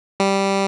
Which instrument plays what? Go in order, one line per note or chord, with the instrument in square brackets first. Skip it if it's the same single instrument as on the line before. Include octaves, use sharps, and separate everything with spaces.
[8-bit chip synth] G3